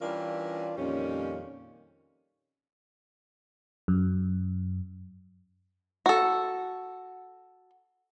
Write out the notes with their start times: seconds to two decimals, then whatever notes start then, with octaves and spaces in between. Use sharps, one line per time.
0.02 E3 G3 C#4 D4 F4 A#4
0.78 F2 A#2 D#3 G3 C#4
3.88 F#2
6.06 F#4 A4